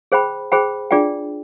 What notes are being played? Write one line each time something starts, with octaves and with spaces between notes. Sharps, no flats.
G#4 C5 G5 B5
G#4 C5 G5 B5
D4 F4 G#4 D5 G5